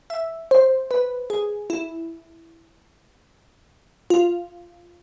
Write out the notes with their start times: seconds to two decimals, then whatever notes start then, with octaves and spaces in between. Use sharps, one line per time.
0.10 E5
0.51 C5
0.91 B4
1.30 G#4
1.70 E4
4.10 F4